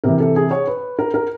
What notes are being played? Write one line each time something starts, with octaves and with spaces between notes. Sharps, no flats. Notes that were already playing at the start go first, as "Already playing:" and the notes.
C3 E3 A#4
A4
G#4
C#5
B4
A#4
A#4